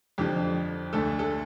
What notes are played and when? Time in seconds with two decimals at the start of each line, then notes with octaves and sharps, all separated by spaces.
0.18 F2 D3 F3 G4
0.93 D2 D3 A3 A4
1.19 A4